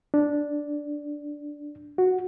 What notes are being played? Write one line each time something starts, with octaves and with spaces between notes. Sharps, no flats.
D4
F#4